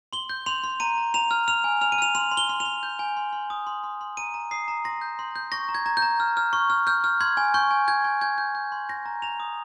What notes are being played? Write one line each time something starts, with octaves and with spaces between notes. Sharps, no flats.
C6 G7
G6
C6 F7
C6
A#5 D#7
A#5
A#5 F7
F6
F6 F7
G#5
F6 F7
D#7
F6 F7
C6 F7
C6
G7
C6
F7
C6
G6
G#5
C6
C6
D#6
C6
C6
C6
A#5 D#7
A#5
D#6 C7
A#5
C6 A#6
G6
C6
G6
C#6 A#6
A#5
G#6
A#5
G6
A#5
F6
F6
C#6
F6
F6 G6
F6
C6 G#6
G#5
C#6 G6
G#5
G6 G#6
G#5
G6 G#6
G6
G6
C6
G6 A#6
A#5
A#5 F7
D#6